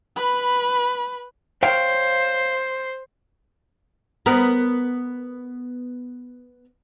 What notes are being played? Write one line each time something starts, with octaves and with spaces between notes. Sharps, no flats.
B4 B5
C5 C#5 F5 G5
B3 A#4